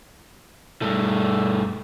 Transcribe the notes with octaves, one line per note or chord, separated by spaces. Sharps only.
G2 A3